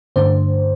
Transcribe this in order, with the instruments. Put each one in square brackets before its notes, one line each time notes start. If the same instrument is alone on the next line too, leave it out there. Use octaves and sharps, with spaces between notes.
[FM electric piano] G2 D3 A3 D4 C5